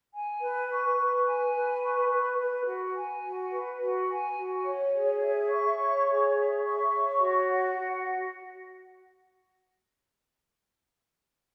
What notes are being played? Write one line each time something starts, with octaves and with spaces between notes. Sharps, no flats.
G#5
B4
C#6
B4
G#5
B4
C#6
B4
B4
F#4
G#5
F#4
B4
F#4
G#5
F#4
C#5
G#4
E5
C#6
C#5
G#4
E5
C#6
C#5
F#4
F#5
F#4